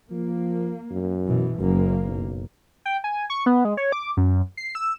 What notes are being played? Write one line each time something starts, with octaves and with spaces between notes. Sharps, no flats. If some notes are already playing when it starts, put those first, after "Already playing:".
F3 A#3
F#2
B2 E3
F#1 F#2 A#3
B1
G5
G#5
C#6
B3
G#3
C#5
D6
F#2
C7
E6